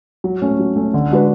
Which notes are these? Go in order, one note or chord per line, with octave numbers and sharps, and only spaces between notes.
F#3
A3 C#4
F#3
A3 C#4
D3
G#3 D4 F#4 B4